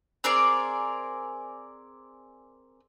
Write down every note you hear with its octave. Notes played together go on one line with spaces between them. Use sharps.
C4 G#4 A#4 D5